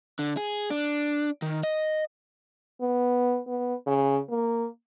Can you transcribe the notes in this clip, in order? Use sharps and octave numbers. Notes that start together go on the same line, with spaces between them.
D3
G#4
D4
D#3
D#5
B3
B3
C#3
A#3